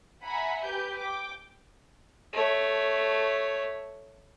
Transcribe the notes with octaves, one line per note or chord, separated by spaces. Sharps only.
E5 F#5 G#5 A#5 B5
G4 B4 G6
G5 D6
A3 C#5